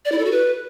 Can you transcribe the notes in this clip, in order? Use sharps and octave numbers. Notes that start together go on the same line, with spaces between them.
D5
E4
A4
F#4
B4